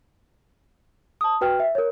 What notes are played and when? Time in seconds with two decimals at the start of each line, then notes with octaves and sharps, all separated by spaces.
1.21 A5 D#6
1.41 F#4 B4 G5 F6
1.60 E5
1.75 A#4 C#5